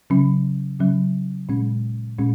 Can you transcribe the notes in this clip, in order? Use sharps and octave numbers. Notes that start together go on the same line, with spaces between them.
C#3 F#3 C#4
C#3 F#3 C#4
A#2 G#3 C#4
A#2 G#3 C#4